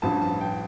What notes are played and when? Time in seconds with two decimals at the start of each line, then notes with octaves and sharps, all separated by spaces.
0.02 A1 G2 F3 A5
0.21 A5
0.41 G5